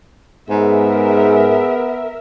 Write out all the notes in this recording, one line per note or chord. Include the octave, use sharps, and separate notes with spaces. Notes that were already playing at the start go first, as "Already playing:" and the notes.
G#2 B3 G#4 A#4 E5